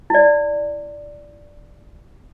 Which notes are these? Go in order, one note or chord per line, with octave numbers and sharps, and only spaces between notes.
E4 D5